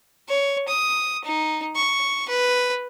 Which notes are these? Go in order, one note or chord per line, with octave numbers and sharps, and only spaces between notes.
C#5
D#6
D#4
C#6
B4